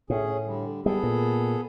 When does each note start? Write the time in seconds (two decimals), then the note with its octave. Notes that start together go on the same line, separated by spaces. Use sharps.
0.10 A2 C#4 G#4
0.46 D3 G3
0.86 G3 B3 G#4 A4
1.03 A#2